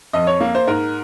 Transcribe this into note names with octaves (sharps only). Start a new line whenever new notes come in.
F2 D#5
C#5
A#3
C5
G#2 A#4